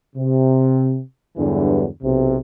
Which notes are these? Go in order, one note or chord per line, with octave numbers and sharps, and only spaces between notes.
C3
E2 G2 D3 E3 F#3 G3
B1 C3